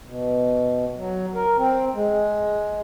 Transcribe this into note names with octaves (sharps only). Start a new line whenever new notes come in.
B2
F#3
A#4
C4
G#3